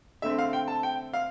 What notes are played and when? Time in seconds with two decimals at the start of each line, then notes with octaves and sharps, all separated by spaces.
0.22 D3 A3 C4 E5
0.38 F5
0.53 G5
0.68 A5
0.83 G5
1.13 F5